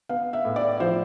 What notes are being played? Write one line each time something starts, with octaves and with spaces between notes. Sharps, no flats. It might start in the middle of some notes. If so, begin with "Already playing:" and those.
B3 F5
E5
A2
D5
F3 C5